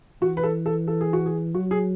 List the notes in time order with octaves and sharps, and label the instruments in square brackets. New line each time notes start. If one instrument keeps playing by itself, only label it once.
[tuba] E3 [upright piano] F#4
[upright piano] B4
A4
A4
A4
G#4
F#4
G#4
[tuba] F#3 [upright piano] F#4
[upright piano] G#4